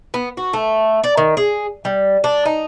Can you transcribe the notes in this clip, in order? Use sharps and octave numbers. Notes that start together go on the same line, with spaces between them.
B3
F#4
A3
D5
D#3
G#4
G3
D4
D#4